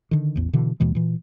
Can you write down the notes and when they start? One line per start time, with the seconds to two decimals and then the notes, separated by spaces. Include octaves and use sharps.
0.11 D3 D#3
0.36 A1 E2
0.53 B2 D3 E3
0.80 D#2 B2 E3 G#3
0.95 A#2 E3